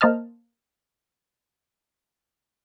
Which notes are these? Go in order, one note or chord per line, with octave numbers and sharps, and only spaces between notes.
A#3 C5 D#5 A5 F6